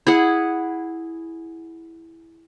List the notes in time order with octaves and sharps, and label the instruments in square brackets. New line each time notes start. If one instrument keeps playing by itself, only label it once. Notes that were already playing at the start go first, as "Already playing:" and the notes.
[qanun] E4 G#4 F#5